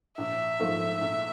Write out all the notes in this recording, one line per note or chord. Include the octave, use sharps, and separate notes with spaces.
A#1 E5
G#2 F3 A3
A#1